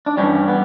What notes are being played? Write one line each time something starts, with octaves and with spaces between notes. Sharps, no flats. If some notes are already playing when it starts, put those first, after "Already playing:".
D4
G2 E3 G3 C#4
B3